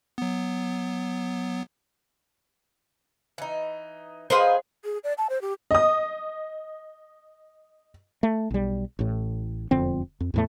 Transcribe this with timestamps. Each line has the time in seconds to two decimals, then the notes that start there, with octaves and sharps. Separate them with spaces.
0.18 F#3 B3
3.38 E3 D#4
4.30 D#4 G#4 B4 C5 F5 G5
4.84 G#4
5.04 D5
5.18 A5
5.30 C5
5.41 G4
5.71 D#5 D#6
8.23 A3
8.51 B1 G3
8.99 A1 A2
9.71 E1 F2 D3 C4
10.20 F2
10.34 E2 A2 A3